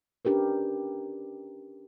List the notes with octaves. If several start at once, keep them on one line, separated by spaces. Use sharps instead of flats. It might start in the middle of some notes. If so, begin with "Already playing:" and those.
C#4 D4 G4 A#4 B4